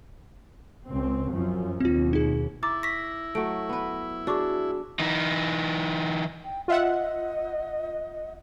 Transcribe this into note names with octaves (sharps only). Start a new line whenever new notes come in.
C#2 C4
F#2 F3
D#2 B2 C4 F4
D#4 G#4
E4 A#5 D6 A6
C#6 A#6 B6
F#3 A3 D7
B3 B4
D4 F#4 G#4 D5 C#6 D6
E3 D#4
G5
F4 D#5 E5 F#5